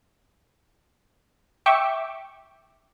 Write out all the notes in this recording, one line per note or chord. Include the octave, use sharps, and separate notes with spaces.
E5 G5 C#6 D6